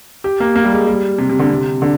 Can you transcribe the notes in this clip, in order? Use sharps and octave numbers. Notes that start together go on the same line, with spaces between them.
G4
A#3
A#3
G3
G#3
G3
C3
C3
D3
C3
D3